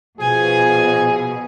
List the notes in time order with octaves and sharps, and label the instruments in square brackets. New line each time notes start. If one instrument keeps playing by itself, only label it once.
[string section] B2 [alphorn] F3 [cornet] G#4 [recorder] G#5